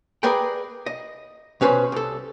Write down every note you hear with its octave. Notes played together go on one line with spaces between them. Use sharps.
G#4 A#4 B4 D5 G5
D#5
B2 C#4 B4 C5
C2 A4